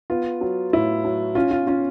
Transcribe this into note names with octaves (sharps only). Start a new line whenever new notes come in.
B3 F4
F#3
A2 E4
F#3
C#4 F4
F4
C#4 F4